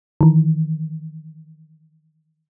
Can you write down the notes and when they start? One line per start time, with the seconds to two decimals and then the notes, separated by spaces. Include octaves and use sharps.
0.21 D#3 E3